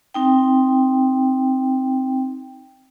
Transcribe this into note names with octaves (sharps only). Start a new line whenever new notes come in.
C4 D#4 G5